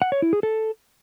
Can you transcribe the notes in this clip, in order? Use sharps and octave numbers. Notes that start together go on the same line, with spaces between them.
F#5
C#5
E4
G#4
A4